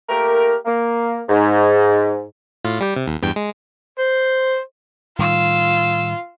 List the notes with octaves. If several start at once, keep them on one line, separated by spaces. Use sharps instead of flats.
A3 A#3 G4 A#4
A#3
G#2
A2 F4
G3 G4
C3
D#2
E2 G2 G5
G#3
C5
A2 D#3 G3 F4 E6